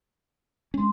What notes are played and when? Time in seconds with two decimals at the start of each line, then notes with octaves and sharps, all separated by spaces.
0.74 G#3 C#4 C6